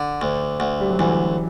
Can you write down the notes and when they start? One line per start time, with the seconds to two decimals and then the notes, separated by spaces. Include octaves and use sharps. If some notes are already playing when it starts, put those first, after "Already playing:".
Already playing: D3
0.21 D2
0.60 D2
0.81 G3
0.90 F#3
0.99 D2 E3